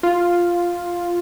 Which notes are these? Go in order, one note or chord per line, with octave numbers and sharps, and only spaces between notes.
F4